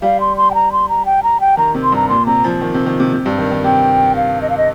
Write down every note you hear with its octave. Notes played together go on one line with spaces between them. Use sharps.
G3 F5
C6
C6
G5
A#5
C6
A#5
G5
A#5
G5
D#3 A#5
C3
C6
G2 A#5
A#2 C6
C3 A#5
F3
D#3
C3
D#3
C3
C3
G2
D#3
D#3
C3 G5
F5
D#5
F5
D#5